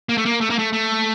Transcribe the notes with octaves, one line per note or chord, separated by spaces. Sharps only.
A#3
A3
A#3
A3
A#3
A3
A3